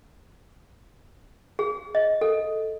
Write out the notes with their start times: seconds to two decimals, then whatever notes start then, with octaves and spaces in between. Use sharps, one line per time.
1.59 G#4
1.95 D#5
2.21 A4